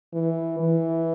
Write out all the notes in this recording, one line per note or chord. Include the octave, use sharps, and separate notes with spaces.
E3
E3